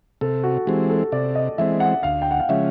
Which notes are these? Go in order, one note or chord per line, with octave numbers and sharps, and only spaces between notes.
C3 A4
F#4
E3 G#3 C4 G4
A4
C3 D5
D#5
E3 G#3 C4 E5
F#5
D2 F5
G5
F#5
F5
C#3 F3 G#3 C#4 E5